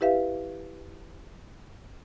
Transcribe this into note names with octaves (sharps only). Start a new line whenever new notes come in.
E4 G4 B4 E5 F5